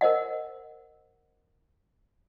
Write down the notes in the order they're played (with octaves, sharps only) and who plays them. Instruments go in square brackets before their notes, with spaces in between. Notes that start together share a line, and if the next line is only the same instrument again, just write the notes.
[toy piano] A#4 C5 D#5 F#5